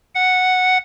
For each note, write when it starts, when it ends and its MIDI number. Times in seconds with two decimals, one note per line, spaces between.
0.15 0.78 78